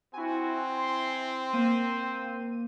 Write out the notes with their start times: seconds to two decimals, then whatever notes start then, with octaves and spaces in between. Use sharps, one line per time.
0.13 C4 E4 F#4 G#5
0.72 C6
1.53 A#3 C5 D#7